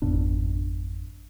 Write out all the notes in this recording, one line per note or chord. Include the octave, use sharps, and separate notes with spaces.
G#1 F2 B2 D4